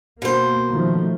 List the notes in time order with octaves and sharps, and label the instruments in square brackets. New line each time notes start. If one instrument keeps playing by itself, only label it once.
[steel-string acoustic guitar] B2 C5 [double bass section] A#3
[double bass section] D#3 F3 A3